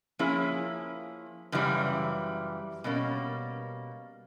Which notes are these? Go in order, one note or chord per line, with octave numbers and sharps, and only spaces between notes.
F3 A#3 C#4 E4 G#4
F#2 C#3 E3 G3
B2 G3 A#3 C#4